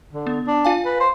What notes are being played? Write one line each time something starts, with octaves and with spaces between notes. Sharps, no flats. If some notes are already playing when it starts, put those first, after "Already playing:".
D3
B3
D4
F4 F5 G#5
B4
C5